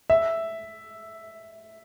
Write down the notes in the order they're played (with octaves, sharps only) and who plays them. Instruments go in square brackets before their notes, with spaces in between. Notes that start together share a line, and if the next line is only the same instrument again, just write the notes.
[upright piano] E5